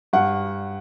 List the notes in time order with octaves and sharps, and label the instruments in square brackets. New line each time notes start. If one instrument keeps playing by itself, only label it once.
[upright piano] G2 F#5